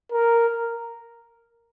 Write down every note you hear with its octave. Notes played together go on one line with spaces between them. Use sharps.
A#4